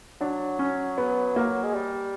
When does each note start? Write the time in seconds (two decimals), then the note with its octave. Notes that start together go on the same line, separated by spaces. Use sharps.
0.21 F#3 D4
0.59 C#4
0.98 B3
1.36 A#3
1.63 G#3
1.73 G3